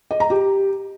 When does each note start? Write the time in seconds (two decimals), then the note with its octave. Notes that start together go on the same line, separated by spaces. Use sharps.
0.11 D#5
0.20 A#5
0.30 G4